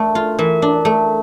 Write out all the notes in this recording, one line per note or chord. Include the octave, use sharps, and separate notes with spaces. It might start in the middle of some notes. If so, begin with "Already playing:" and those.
Already playing: A3 D4 A#4
F4
E3 A#4
D4
A3